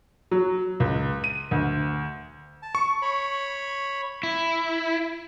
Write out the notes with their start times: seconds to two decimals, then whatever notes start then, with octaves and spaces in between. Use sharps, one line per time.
0.31 F#3
0.80 C#2
1.24 D#7
1.51 D2
2.63 A5
2.75 C#6
3.02 C#5 B5
4.23 E4